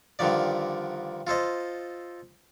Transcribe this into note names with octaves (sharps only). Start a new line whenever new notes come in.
G2 D3 D#3 F3 D5
F4 A4 C5 D#5